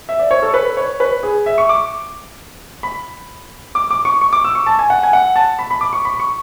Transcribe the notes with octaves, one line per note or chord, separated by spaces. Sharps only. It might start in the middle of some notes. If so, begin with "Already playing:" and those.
E5
D5
C#5
A4
B4
C#5
B4
G#4
E5
C#6
D6
B5
D6
D6
C#6
C#6
D6
E6
C#6
A5
G#5
F#5
G#5
F#5
A5
B5
B5
D6
C#6
B5
C#6